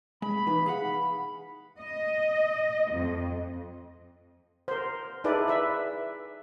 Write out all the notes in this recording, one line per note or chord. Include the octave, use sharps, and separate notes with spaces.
G#3 B5
E3 D#4 B4
G#4 F5 F#5 B5
D#5
F2
A#4 C5
D#4 E4 G#4 A4 B4 D5
B4 E5